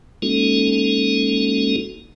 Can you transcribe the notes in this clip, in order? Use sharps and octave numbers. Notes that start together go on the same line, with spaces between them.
G#3 A#3 C#4 D#4 F#4 A4